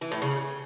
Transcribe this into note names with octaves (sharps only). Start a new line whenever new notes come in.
E3
A2
C#3